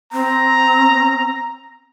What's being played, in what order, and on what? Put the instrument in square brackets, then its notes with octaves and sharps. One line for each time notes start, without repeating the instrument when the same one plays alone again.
[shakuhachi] C4 [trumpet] A#5